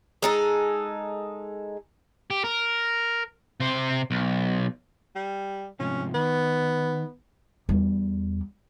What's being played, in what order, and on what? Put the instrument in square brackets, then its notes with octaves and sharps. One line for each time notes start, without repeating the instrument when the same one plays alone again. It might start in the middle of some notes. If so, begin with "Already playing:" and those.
[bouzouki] G#3 D#4 A4
[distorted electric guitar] G4
A#4
C3 C5
B1
[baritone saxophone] G3
[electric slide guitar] G#2 C3 F3 [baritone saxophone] C#4
[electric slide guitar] D#3 [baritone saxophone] B3
[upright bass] E2 G3